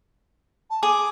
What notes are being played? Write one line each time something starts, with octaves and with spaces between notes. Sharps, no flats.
A5
G#4 G#5 D6 D#6